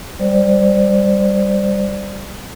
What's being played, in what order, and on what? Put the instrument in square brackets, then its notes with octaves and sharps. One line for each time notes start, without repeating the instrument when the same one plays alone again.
[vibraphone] G3 C5 D5